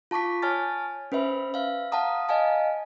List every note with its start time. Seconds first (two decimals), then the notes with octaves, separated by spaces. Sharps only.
0.11 F4 A5 C#6 D6 B6
0.42 C#5 G#5 A5 F6 A6
1.12 C#4 B4 C5 E5 B5
1.54 E5 F5
1.92 F5 F#5 A5 A#5 D#6
2.29 D#5 F5 G#5 A5